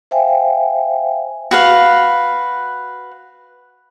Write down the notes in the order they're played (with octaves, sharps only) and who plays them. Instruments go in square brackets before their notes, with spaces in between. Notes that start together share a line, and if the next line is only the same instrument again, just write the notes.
[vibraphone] C5 E5 F5 G5 G#5
[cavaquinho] F#4 B4 F5